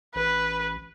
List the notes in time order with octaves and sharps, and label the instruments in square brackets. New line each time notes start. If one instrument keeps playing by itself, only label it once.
[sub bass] A1 [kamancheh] B4